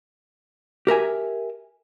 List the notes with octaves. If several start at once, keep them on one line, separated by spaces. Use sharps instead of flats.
G4 A#4 E5 G#5